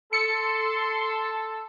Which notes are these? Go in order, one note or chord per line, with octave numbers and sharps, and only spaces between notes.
A4 C6 C#7